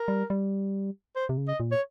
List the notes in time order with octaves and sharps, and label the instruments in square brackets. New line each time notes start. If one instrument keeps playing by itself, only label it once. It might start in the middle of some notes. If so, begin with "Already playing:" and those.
Already playing: [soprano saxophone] A#4
[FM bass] G3
G3
[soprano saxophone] C5
[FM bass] C3
C#3
[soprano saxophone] D#5
[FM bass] A#2
[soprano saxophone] C#5